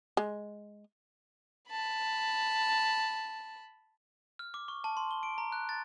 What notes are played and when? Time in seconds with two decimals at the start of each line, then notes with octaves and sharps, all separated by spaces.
0.17 G#3
1.70 A5 B5
4.39 F6
4.54 D6
4.68 C#6
4.84 A5
4.97 C6
5.11 G7
5.23 D7
5.38 A#5
5.52 F#6
5.69 A6